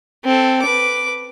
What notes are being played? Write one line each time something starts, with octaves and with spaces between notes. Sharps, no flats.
C4 A4
B4 D6